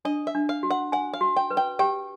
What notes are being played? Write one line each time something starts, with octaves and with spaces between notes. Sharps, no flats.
D4 D#5
E5
D4
F5
F#4
F#5
F#5 G#5
F5
F#4
G5
B4
G5
G4 G5